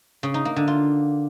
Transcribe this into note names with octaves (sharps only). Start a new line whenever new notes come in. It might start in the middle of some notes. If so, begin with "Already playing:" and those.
C#3
D#4
A#3
D3
F4